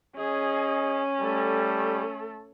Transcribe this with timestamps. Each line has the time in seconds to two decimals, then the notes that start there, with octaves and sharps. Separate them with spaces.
0.18 C#4 G#4 D#5
1.21 G3 A3 A4